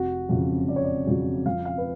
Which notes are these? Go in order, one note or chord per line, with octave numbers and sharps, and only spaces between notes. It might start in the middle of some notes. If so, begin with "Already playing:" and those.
Already playing: F1 F#4
F2 C#3 F#3
F1 D5
C#5
D5
F2 C#3 F#3
F2 F5
F5
B4